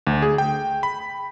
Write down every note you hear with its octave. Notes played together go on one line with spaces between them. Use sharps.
D2
G#4
G5
B5